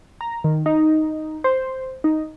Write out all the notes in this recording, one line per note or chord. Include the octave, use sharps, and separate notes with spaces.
A#5
D#3
D#4
C5
D#4